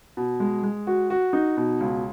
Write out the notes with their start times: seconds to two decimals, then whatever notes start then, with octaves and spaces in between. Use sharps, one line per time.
0.17 B2
0.40 G#3
0.63 G#3
0.87 F#4
1.10 F#4
1.33 D#4
1.57 B2
1.81 C#2